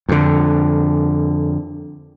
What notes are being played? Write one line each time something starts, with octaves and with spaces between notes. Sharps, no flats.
F2 D3